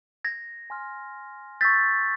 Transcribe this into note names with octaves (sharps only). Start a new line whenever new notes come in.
G#6 A#6
G#5 C6 F6
C#6 E6 G6 A6 B6